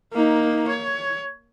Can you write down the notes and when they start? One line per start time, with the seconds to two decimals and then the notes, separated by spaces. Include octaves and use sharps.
0.13 A#3 D#4
0.68 C#5